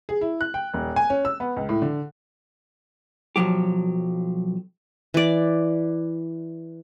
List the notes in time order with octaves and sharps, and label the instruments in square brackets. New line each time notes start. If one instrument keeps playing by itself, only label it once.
[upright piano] G#4
E4
F#6
G5
D#1
G#5
C#4
E6
B3
C#2
A2
D3
[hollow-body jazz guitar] B1 F#2 F3 F#3 G4
[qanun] E3 D5